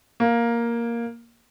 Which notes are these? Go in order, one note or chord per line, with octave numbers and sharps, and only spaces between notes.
A#3